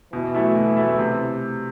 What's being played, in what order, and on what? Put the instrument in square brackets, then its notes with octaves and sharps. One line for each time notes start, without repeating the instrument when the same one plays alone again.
[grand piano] B2 [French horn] E3
[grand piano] F#3 A3 E4
B2
F#3 A3 E4
C3